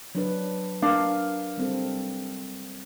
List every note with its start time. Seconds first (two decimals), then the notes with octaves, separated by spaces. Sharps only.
0.15 F#3 D4 B4
0.82 D4 A#4 F5
1.58 G3 C4 A4